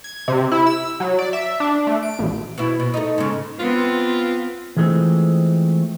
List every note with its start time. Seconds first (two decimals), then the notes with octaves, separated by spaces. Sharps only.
0.04 G#6
0.28 C3
0.52 E4
0.67 E6
1.00 F#3
1.19 D5
1.33 E5
1.60 D4
1.87 A3
2.03 D7
2.19 A1
2.58 B2 E4
2.80 B2
2.94 A3 D#4
3.18 G#2 C#3
3.59 B3 C4 F4
4.76 E3 F3 G#3 A3 C4